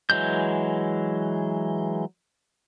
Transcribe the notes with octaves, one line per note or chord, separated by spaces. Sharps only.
E3 F#3 G#3 G6